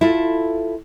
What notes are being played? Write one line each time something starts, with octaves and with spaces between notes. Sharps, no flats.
E4 F4 A4